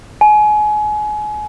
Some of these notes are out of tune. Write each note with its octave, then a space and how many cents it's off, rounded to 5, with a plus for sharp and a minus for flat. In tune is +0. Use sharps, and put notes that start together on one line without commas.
G#5 +30